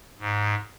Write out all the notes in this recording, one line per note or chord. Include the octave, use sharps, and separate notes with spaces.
G#2